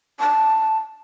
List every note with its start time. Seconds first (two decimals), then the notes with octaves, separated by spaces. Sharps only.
0.20 A5